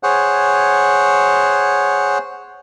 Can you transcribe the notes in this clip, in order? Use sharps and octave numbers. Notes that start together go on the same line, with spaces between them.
G#4 C5 C#5 F#5